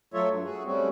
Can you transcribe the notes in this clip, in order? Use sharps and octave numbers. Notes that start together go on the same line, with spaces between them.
F#3 A3 F4 A4 C#5 E5
G2 F#3
F#4 G#4
G3 A3 C4 C#4 F#4